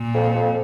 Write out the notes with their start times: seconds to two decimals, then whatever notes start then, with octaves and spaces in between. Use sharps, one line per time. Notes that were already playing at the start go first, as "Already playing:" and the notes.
Already playing: A#2
0.14 F2
0.35 F2